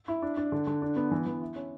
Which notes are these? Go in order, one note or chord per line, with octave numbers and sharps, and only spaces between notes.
E4
D4
D4
D3
D3
D4
B3
E3
E3
E4
C#4